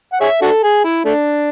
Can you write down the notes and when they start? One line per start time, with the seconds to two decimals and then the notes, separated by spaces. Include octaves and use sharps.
0.13 F#5
0.21 G#4 C#5 E5
0.42 D4 F#4 A4
0.63 G#4
0.84 E4
1.05 A3 D4